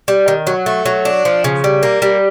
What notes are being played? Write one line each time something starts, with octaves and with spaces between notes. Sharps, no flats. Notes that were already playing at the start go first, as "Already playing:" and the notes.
G3
D#3
F#3
A3
F#3
D4
F3
C#3
G3
A#3
G3